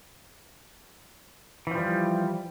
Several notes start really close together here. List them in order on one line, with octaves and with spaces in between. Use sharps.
E3 F3 G3